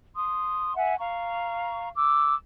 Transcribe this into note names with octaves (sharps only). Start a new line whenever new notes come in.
C6 D#6
E5 F#5 G#5
F5 A#5 C#6
D6 E6